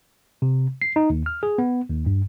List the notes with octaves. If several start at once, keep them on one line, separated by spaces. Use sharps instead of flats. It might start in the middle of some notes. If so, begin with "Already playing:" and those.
C3
C7
D#4
D#2
F6
G#4
B3
D#2
G2